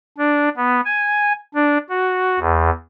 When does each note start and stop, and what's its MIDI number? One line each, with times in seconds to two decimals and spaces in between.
0.18 0.49 62
0.57 0.81 59
0.85 1.33 80
1.54 1.78 62
1.90 2.39 66
2.39 2.70 40